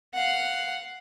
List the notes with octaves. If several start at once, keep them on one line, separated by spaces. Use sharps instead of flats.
F5 F#5